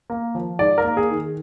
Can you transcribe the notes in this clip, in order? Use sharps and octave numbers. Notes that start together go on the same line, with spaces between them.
A#3
F3
G#2 D5
A#4
A#3
G#4
D#3